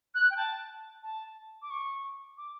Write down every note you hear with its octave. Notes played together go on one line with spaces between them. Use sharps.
F#6
G5
A5
A5
D6
C#6
D6